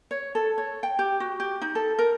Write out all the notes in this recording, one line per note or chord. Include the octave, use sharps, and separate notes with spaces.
C#5
A4
C#5
G5
G4
F#4
G4
D#4
A4
A#4